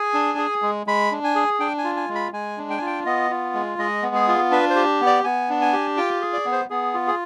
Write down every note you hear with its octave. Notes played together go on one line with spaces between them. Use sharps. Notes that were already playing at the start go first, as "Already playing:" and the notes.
Already playing: G#4 G#5
D4
G#4
G#3
G#3 B5
D4
G#5
G#4
D4 G5
G#5
F4
G#5
G#3
B5
G#3 G#5
D4
G5
G#5
F4 G5
B3 D#5
F4
G#3
G#3 D#5
B3
G#4
F4
D4 B4
C5
G4
B3
D5
B3 G#5
D4
G#5
G4
F4 G5
G#4
D5
B3
C5
B3 G#4
F4
G#4